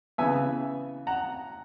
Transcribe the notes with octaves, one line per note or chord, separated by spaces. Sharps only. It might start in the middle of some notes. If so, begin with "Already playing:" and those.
C#3 E3 B3 E5 G#5
F#5 A#5